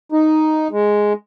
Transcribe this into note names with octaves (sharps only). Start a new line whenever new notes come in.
D#4
G#3